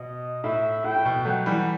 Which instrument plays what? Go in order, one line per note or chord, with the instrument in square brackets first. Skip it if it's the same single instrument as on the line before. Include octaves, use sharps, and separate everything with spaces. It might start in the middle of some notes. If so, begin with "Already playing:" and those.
Already playing: [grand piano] B2 [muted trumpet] D#5
[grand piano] A2 [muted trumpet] E5
[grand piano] A2 [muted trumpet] G5
[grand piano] A2
B2
[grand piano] F#3 A3 [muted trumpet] F#5
[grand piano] E3 G3